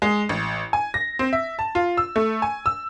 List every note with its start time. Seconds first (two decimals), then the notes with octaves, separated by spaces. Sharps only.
0.02 G#3
0.29 A1
0.73 G#5
0.94 A#6
1.19 C4
1.33 E5
1.59 A5
1.75 F4
1.97 E6
2.16 A3
2.42 G#5
2.66 E6